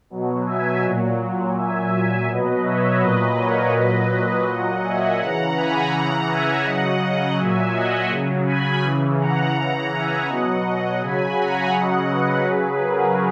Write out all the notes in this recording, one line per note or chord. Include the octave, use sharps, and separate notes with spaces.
B2 F#3
E5 G#5
A#2 F#3
A#2 F#3 E5 G#5
B2 F#3 B4 D#5
C#5 E5
A#2 F#3 B4 D#5
A#4 C#5
A#2 F#3 B4 D#5
A#2 F#3 D#5 F#5
E5 G#5
C#3 E3 F#5 A#5
G#5 B5
C#3 E3 F#5 A#5
E5 G#5
C#3 F#3 D#5 F#5
A#2 F#3 E5 G#5
D#5 F#5
C#3 F#3
G#5 B5
C#3 E3
F#5 A#5
C#3 E3 F#5 A#5
E5 G#5
B2 F#3 D#5 F#5
C#3 F#3 G#5 B5
F#5 A#5
C#3 F#3 D#5 F#5
B4 D#5
C#3 F#3 G#4 B4
F#4 A#4